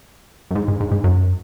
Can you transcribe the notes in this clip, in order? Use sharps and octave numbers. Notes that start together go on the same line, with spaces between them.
F#2
G#2
G#2
G#2
G#2
F#2